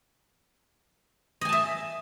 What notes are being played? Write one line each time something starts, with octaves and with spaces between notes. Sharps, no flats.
D#5 E5 G#5 A5